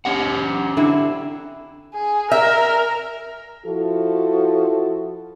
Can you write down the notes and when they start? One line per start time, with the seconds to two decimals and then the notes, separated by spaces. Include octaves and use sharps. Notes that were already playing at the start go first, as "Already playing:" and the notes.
0.05 C#4 G4 F#5
0.77 D3 C4 E4
1.94 G#4
2.32 A#4 E5
3.66 F3 E4 F#4 A4